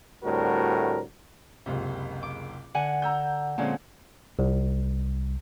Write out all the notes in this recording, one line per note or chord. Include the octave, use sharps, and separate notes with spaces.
D2 A2 G3 C4 F#4 A#4
F#1 C#2 C3
D6
D3 F#5 G#5
A#5 E6 G6
A#2 D3 G#3 C4 C#4
C2